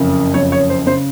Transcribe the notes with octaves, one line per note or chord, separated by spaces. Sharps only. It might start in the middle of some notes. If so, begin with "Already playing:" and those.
Already playing: F#1 F2 C#3
F#1 F2 C#3 C#5
C#5
C5
C#3 C5